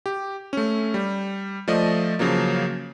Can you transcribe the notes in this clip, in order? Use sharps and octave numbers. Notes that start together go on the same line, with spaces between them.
G4
A3 C#4
G3
F3 A3 D5 D#5
C#3 F3 F#3 A#3